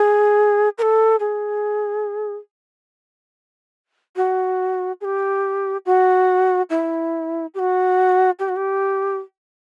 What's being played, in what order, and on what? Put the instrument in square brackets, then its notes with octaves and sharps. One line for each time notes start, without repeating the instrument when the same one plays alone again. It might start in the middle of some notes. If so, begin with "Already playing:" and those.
Already playing: [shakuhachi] G#4
A#4
A4
G#4
F#4
G#4
G4
F#4
E4
G4
F#4
G4
F#4
G4